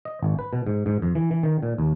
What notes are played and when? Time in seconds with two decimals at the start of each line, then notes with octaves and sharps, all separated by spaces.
0.05 D#5
0.23 G#1
0.39 B4
0.53 B2
0.67 G#2
0.86 G#2
1.02 F2
1.15 E3
1.31 E3
1.43 D#3
1.63 A#2
1.78 D#2